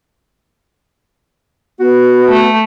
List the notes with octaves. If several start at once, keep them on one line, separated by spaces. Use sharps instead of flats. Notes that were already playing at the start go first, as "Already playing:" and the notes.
B3 F#4
A3